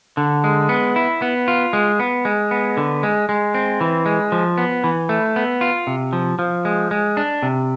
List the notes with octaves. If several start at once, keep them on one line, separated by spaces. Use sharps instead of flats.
D3
G#3
B3
E4
B3
F4
G#3
B3
G#3
B3
D3
G#3
G#3
C4
E3
G#3
F3
B3
E3
A3
B3
F4
C3
F3
F3
G#3
G#3
D4
C3